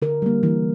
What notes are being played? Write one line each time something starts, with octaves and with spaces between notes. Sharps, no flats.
D3 A#4
G3 A#3
E3